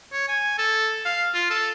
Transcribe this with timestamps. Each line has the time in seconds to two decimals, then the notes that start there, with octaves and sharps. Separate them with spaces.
0.13 C#5
0.28 G#5
0.58 A4
1.05 F5
1.34 F4
1.50 A4